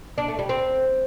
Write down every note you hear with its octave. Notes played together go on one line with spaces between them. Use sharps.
D4
A3
G3
C4